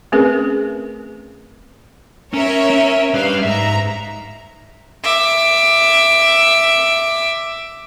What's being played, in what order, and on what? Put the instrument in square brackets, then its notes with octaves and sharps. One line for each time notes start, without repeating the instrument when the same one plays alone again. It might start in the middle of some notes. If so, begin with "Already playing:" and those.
[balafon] A3 C4 C#4 G#4 A#4 B4
[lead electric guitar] C#4 [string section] A#4 C#5 E5
[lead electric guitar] C#4
[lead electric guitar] G3 B4 [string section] F5
[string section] G#2 A#5 [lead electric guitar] E5
[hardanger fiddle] E5 D6